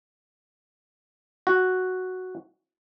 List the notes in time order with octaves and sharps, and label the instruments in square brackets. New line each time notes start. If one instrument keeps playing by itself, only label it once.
[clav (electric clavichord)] F#4